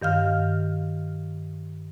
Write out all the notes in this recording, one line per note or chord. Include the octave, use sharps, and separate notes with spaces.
G2 D#3 F5 F6